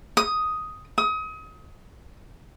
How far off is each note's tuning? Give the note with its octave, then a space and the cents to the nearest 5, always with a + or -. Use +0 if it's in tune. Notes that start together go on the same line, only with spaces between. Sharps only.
D#6 +5
D#6 +30